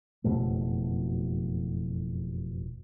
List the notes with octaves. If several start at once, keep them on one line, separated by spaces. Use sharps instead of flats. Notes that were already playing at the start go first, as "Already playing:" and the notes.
F#1 F2 B2 A3